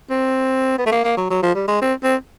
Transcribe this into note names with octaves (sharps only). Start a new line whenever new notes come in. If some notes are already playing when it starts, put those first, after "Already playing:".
C4
B3
A3
A#3
A#3
F#3
F#3
F3
G3
G#3
C4
C4